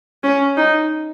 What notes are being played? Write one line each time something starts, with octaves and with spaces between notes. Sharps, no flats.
C#4
D#4